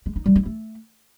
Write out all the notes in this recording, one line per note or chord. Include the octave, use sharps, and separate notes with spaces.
G#3
D#4
G3
E4
A3